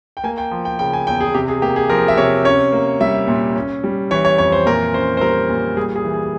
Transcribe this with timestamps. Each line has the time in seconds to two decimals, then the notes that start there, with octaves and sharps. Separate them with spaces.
0.17 G5
0.24 A#3 G#5
0.38 G5
0.51 F3
0.65 G5
0.79 C#3 G5
0.93 G#5
1.07 E2 G5
1.21 G#4
1.34 C3 G4
1.48 G#4
1.62 A#3 G4
1.76 G#4
1.90 F3 A#4
2.08 E5
2.18 C3 C#5
2.45 C#4 C#5
2.72 A#3
3.00 G3 E5
3.28 A#2
3.55 C#4
3.84 G3
4.11 E3 C#5
4.25 C#5
4.38 F2 C#5
4.52 C5
4.66 A#2 A#4
4.93 C#4 C5
5.17 C5
5.21 G3 A#4
5.49 A#2
5.77 G3 G#4
5.96 G#4
6.05 E3
6.14 G#4